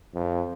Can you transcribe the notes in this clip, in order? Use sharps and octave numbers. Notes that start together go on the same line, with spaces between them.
F2